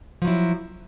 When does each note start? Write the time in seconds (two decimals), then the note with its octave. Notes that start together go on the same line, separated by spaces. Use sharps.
0.22 F3
0.25 F#3
0.27 E4